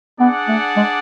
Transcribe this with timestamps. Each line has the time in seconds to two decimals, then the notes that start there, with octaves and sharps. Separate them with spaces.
0.19 B3 D4 G#4 D5 F#5
0.48 A3
0.76 G#3